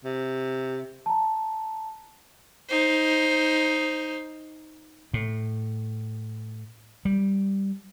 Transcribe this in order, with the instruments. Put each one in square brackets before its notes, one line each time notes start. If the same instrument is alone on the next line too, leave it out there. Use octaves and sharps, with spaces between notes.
[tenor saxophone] C3
[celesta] A5 A#5
[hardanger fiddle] D#4 C5
[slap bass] A2
G3